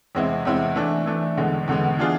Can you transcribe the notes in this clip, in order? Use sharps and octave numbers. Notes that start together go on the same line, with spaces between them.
E2 C3 G#3 C4 E4
E2 C3 G#3 C4 E4
E3 A3 D4
E3 A3 D4
E2 D3 G#3 B3
E2 D3 G#3 B3
E3 B3 D4 F4 G#4